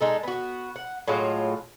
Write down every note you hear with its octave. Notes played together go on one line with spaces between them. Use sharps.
G#3 D#4 A4
B3 F#4
F#5
A2 F#3 G#3 F4